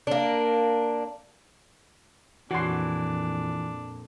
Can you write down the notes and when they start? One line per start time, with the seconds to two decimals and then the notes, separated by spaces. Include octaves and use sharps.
0.07 A#3 D4
2.51 F2 A#2 E3 D4 F#4 C6